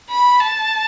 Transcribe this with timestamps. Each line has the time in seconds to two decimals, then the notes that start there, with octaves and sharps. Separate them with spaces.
0.10 B5
0.40 A5